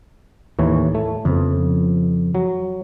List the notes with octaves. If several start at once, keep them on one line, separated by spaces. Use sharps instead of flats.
D#2 A2 E3 C#5
A3
F2 C#3 F3 B3
F#3